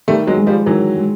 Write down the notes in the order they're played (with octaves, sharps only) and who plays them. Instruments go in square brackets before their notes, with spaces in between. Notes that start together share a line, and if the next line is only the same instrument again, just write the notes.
[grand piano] D#3 [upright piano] G3 A3
[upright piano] F#3 G#3
[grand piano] G#3
[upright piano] F3 G3
[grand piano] D#3 [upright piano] E3 F#3
[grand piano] G#3